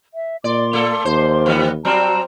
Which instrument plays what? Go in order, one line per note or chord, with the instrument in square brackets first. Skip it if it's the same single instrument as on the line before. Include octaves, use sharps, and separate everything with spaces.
[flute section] E5
[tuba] A#2 [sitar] D5 [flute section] C6 D6
[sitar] A3 A4
[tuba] D#2 [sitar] C5
[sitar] E3 G3 B3
[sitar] F#3 G3 C4 [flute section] F#4 A5 A#5